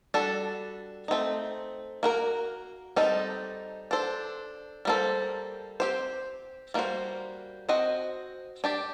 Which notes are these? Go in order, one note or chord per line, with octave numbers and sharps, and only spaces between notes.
G3 D4 F#4 A4
A3 C4 D#4
A#3 F#4 A#4
G3 C4 D#4 A4 D#5
D4 A4 C5
G3 A#3 D#4 A4 C5
C4 G4 C5
G3 A#3 F#4 C5
C4 F#4 C5 D#5
D4 G4 D5